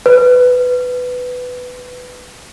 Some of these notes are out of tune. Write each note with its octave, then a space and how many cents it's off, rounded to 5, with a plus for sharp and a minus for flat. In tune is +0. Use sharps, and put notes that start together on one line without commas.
B4 +10